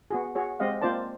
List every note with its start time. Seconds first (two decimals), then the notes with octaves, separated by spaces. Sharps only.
0.11 B3 F#4 G#4
0.35 F#4 G#4 C#5
0.59 G#3 C4 G4 D#5 F5 F#5
0.81 A#3 C4 F4 C5 D5 A5